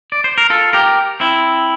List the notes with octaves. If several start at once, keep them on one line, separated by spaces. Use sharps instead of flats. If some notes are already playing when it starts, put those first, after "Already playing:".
D5
C5
A#4
F4 A4
G4 A#4
C4 E4